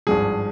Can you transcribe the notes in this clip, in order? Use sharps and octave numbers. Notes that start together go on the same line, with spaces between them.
G#1 G2 F3 G#4